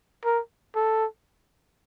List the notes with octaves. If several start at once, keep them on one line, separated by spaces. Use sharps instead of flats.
A#4
A4